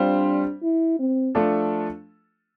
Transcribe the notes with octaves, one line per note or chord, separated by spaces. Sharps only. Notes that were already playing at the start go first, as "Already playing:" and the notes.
Already playing: G3 C4 D4 F4 C5
E4
C4
F3 A3 D4 F4 A4